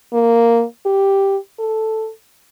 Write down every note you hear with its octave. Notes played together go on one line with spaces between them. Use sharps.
A#3
G4
A4